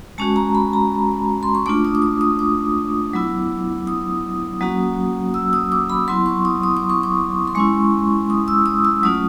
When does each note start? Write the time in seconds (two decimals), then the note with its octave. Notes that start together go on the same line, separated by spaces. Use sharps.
0.18 G#3 C#4 F#4 A5
0.36 A#5
0.55 B5
0.73 A#5
1.43 C6
1.55 C#6
1.66 A3 D4 F4 D6
1.85 D#6
1.95 D6
2.02 D#6
2.21 D#6
2.39 D6
3.13 F#3 B3 E4
3.87 D#6
4.61 F#3 A#3 C#4 F#4
5.34 E6
5.53 D#6
5.72 D6
5.90 B5
6.08 F#3 B3 E4 C6
6.26 C#6
6.45 D#6
6.63 D#6
6.77 D6
6.90 C#6
7.03 D6
7.47 C6
7.55 G#3 C#4 E4 C#6
8.30 D#6
8.48 E6
8.66 D#6
8.85 E6
9.03 F#3 A3 C#4 F4 D#6